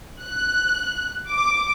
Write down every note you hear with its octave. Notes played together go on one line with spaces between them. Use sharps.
F#6
D6